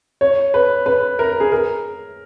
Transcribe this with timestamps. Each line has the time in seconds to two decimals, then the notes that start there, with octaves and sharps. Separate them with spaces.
0.21 C#5
0.54 B4
0.86 B4
1.19 A#4
1.40 G#4
1.52 A#4